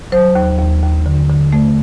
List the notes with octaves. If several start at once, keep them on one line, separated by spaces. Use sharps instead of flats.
F#3 C5
D#2
D#2
D#2
D3
D3
A3